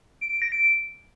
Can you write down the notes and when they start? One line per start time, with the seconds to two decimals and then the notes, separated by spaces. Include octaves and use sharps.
0.21 D7
0.31 D7
0.42 A#6
0.52 D7